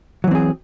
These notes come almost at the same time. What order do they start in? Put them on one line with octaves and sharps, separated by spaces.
F#3 E3 C4 G#4